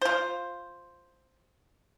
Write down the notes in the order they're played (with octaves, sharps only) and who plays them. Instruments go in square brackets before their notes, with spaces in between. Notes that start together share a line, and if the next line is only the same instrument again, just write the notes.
[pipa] F4 C5